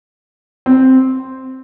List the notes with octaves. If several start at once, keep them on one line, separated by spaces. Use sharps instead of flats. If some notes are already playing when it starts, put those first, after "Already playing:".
C4